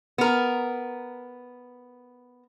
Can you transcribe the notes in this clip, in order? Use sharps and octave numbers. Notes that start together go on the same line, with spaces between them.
B3 A#4